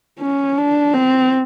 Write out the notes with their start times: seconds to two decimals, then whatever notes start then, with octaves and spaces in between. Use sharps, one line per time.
0.20 C#4
0.57 D4
0.94 C4